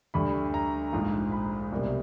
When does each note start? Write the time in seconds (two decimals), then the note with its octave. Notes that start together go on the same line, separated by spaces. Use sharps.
0.14 D2 D3 G3 B5
0.54 A#5
0.93 A#1 G#2 F3
1.32 B5
1.72 C2 B2 G3 A#3